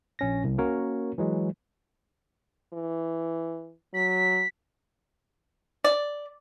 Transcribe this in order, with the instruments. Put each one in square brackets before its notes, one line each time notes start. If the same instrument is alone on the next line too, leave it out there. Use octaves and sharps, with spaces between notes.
[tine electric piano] A#1 C#4 A#6
C2
A#3 C#4 F#4 A#4 C#5
E3 F#3 G#3
[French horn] E3
[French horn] F#3 [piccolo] B6
[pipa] D5